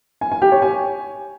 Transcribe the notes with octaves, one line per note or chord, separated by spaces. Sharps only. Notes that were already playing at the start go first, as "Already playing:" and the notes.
G#5
G#5
G4
C#5
G#5